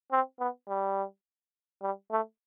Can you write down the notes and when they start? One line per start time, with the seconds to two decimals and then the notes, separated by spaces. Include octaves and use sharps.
0.12 C4
0.40 B3
0.69 G3
1.82 G3
2.11 A3